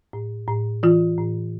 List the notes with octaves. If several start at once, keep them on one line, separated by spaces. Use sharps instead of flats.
A2
A2
E3 F4
A2